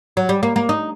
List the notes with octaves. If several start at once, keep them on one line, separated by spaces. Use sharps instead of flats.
F#3
G3
A#3
A#3
D#4